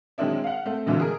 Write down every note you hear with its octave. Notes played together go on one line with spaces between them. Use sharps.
D#3 F#3 G#3 C4 D4 E4
F5 F#5
A3 C4
B2 D3 E3 A3 B3 F4
G#4 A#4